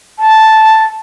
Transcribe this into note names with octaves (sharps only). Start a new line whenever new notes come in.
A5